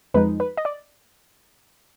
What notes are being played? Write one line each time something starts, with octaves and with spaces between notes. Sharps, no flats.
F2 F3 G#3 D#4 B4
B4
D#5
D5